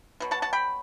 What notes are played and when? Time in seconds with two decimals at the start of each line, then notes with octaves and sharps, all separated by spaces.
0.20 B2 F#3
0.31 F#5 A5
0.42 F#5 A5
0.53 G5 B5